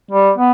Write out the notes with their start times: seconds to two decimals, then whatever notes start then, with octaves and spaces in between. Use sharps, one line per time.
0.11 G3
0.37 B3